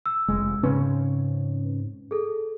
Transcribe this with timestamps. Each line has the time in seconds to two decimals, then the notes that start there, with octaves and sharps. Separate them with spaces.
0.06 E6
0.28 F1 G#3
0.63 G#2 C#3 C4 C#4 B4
2.11 G#4 A4